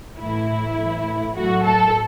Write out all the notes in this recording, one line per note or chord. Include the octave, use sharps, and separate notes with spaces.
A2 E3 A3 E4
A2 E3 A3
A2 F#3 A3 F#4
A4